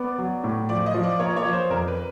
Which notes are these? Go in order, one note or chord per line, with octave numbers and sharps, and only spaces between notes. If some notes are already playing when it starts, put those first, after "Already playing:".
Already playing: B3 D5
F#3
A2
F3 D5
D#5
F3
D5
A#3 C#5
C#5
F3
C5
F2 A#4
B4